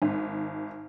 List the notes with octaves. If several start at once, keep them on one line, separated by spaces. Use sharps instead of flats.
G#1